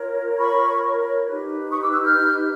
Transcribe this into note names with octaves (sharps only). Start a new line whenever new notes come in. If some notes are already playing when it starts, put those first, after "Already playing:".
Already playing: F4 A#4 C#5
B5 C#6
D#4 G4 B4
C#6 D#6
D6 E6
E6 F#6
F6 G6